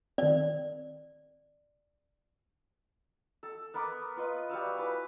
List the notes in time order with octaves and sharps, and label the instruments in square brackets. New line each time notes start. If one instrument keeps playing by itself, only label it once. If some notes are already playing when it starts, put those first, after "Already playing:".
[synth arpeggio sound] D#3 C4 [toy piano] D5
[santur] A4
B3 A#4 B4 D6
B3 F4 B4 D#5
G3 F#4 F5 E6
E4 B4 G#5 D6